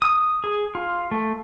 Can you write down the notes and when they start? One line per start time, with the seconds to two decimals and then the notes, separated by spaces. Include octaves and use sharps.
0.02 D#6
0.44 G#4
0.75 F4
1.11 A3